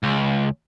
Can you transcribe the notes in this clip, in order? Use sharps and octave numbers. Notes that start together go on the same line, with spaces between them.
C#2